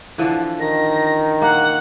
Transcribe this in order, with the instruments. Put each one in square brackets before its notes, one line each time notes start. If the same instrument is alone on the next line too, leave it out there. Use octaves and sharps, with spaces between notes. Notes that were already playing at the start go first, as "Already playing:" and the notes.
[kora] D3 E3 F3
[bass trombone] D#3 [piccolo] A#6
[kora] A#3 [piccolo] F#5